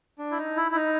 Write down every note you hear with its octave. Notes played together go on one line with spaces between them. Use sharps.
D4
E4
D#4
E4
E4
D#4